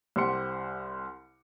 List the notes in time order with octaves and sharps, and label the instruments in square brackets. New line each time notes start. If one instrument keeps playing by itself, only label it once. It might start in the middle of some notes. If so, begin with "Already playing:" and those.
[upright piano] C2 G4 C5 F#5 C6 C#7